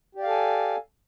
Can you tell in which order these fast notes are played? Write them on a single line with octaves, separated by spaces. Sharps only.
G4 D5 F5 A4 G#5